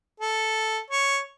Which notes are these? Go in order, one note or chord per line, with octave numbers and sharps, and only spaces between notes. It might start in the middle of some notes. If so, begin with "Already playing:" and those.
A4
C#5